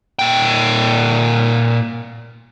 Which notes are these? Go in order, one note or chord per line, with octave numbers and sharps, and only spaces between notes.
A#2 G5